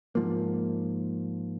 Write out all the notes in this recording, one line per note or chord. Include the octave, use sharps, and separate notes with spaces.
G#2 F3 A#3